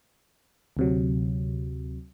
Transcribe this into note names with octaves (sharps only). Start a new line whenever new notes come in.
D2 C3 F#3